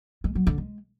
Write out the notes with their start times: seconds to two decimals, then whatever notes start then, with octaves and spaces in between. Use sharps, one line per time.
0.24 G#3
0.35 F#3
0.47 D3
0.58 G#3